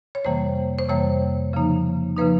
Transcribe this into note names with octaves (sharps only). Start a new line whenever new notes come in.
C#5
F2 C3 E3 G3 A#3 C5
C5
F2 C3 E3 G3 A#3 C#5
C#3 F3 A#3 D#4
C#3 F3 A#3 D#4 B4